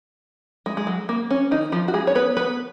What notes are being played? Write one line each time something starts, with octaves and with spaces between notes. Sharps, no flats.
G#3
G#3
F#3
A#3
C#4
D#3 D#4
F3 F4
F#4
G#3 G#4
C#5
B3 B4
B3 B4